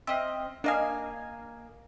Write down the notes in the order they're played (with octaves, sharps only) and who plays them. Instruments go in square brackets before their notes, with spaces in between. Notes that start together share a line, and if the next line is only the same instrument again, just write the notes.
[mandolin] C4 D#5 F6 [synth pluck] E5
[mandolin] A#3 G#5 [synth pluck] D4 D#5 F5